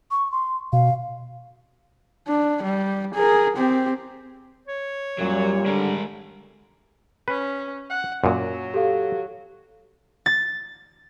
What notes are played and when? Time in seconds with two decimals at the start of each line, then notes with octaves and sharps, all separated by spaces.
0.11 C#6
0.32 C6
0.73 B2 F5
2.27 D4
2.63 G3
3.15 G#4 A#4
3.57 C4 G4
4.68 C#5
5.19 F#2 A#2 F#3 G3
5.66 D3 G#3 A#4
7.28 C#4 B4
7.90 F#5
8.24 F#2 A#2 F#3
8.74 G4 A4 F5
10.26 A6